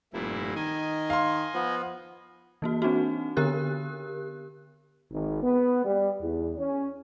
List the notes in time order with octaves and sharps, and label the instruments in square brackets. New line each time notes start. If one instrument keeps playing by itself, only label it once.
[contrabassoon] F1 [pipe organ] G2 A#2 E4
[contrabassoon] D#3 [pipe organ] D#5 G#5
[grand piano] F5 C6
[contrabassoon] F3 [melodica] B3
[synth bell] E3 A#3 F#4
C4 D4 D#4 F#4
D3 B3 G4 A#4 F#6
[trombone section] G#1
B3
G3
E2
C#4